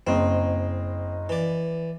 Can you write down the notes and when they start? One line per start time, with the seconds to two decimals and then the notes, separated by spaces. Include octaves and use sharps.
0.07 F#1 C4 D#5
1.29 E3 D5